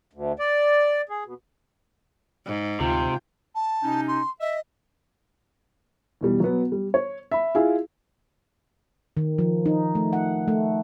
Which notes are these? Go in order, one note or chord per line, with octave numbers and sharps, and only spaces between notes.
D2
D5
G#4
B2
G#2
D2 C3 F4 G5
A5
C3 C#4 D#4
C6
D#5 E5
E2 B2 G3
F#3 B3
G3
C#5
E5 B5
E4 F4 G#4 F5 G#5
D#3
F3
D#4
A3
F#5
A3